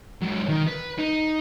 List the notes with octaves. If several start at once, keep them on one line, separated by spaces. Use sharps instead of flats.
G#2 F#3
D#3
B4
D#4